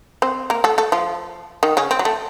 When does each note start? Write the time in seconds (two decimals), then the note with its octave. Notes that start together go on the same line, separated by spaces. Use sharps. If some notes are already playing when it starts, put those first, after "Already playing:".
0.22 C4 C5
0.50 A#3 A#4
0.64 A3 A4
0.78 A3 A4
0.92 F3 F4
1.63 D#3 D#4
1.77 C#3 C#4
1.91 C4
1.99 F#3
2.05 A3